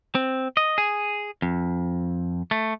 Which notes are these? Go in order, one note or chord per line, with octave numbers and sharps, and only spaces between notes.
C4
D#5
G#4
F2
A3